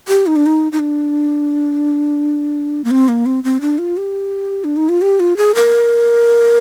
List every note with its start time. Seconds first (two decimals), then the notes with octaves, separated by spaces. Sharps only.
0.08 G4
0.27 D#4
0.36 D4
0.46 D#4
0.72 D#4
0.79 D4
2.84 A#3
2.91 C4
3.08 A#3
3.26 C4
3.44 C4
3.61 D4
3.78 F4
3.97 G4
4.64 D4
4.76 D#4
4.89 F4
5.02 G4
5.20 F4
5.37 G#4
5.55 A#4